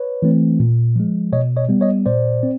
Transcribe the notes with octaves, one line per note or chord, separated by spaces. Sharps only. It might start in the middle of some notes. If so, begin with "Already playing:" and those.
Already playing: B4 C#5
E3 A3 C4
A#2
F3 G#3
B2 C#5 D#5
C#5 D#5
G3 B3
C#5 D#5
A#2 C5 D5
C4